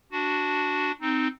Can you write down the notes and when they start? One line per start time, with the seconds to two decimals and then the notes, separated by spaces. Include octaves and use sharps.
0.12 D4 F#4
1.01 C4 D#4